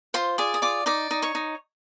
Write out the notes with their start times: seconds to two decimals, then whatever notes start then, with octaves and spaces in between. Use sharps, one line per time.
0.14 F4 C5 C6
0.38 G#4 D5 D6
0.54 D#6
0.62 F4 D5 D6
0.86 D#4 D5 D6
1.11 D#4
1.22 C#5 C#6
1.35 D#4